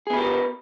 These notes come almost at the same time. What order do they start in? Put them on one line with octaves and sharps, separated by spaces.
G#4 B3 B4 G4 A#4